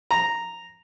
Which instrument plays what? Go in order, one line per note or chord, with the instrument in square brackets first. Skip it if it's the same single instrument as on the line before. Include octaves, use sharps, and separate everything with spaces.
[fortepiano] A#5